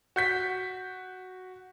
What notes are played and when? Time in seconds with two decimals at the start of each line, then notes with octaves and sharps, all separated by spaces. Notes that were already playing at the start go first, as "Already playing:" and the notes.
0.16 F#4 G6 B6